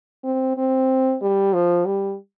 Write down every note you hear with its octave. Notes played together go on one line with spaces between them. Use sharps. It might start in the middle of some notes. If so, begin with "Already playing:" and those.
C4
C4
G3
F3
G3